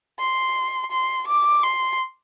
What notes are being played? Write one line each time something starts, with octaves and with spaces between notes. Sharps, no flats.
C6
C6
D6
C6